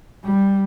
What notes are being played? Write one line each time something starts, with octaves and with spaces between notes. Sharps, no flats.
G3